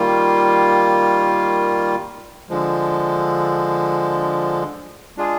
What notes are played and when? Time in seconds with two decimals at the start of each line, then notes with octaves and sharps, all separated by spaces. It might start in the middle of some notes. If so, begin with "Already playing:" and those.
Already playing: D#3 G3 A#3 F4
2.49 D3 F3 G#3
5.17 G#3 D4 F4 G#4